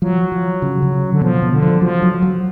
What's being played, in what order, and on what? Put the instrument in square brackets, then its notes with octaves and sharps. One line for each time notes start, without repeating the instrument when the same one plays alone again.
[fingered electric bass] F3 [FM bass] F#3
[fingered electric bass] F3
C#3
C#3
[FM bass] D3
[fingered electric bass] B2 [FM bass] F3
[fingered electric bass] B2
[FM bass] D3
[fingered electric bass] F3
[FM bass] F3 [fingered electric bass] F#3
[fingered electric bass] F#3
F#3